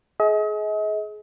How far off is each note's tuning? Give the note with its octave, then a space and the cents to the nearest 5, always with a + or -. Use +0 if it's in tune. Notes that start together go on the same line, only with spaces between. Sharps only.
G#4 +30 D#5 +40